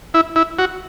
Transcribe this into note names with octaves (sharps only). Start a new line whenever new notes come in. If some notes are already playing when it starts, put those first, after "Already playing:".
E4
E4
F#4